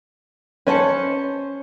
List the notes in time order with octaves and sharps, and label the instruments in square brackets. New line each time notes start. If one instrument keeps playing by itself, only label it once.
[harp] C#4 C#7 [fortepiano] B4 C5 A5